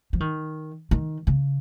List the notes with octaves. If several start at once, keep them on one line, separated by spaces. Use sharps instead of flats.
F3
D#3
D#3
C#3